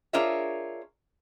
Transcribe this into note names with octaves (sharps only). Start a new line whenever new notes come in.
D4 F4 G#4 A#4 C#5 E5